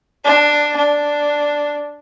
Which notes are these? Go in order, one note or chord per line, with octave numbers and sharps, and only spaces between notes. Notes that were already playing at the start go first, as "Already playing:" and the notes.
D4
D4